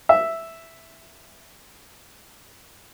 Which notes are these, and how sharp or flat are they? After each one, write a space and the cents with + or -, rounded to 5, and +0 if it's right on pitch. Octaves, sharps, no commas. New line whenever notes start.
E5 +0